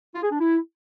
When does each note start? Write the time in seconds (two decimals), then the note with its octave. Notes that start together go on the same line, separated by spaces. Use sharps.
0.14 F4
0.23 G#4
0.31 D4
0.40 E4